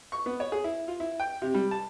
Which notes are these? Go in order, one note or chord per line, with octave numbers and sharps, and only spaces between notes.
C#6
B3
C#5
G#4
E4
F4
E4
G5
C3
G3
A5